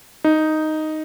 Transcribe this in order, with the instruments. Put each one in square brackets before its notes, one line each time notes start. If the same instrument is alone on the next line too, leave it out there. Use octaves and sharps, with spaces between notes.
[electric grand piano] D#4